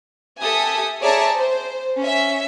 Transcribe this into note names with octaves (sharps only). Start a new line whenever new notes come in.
G4 A4 E5 G#5 D#6
G#4 C#5 D5 E5 A5 A#5
C5
C#4 E5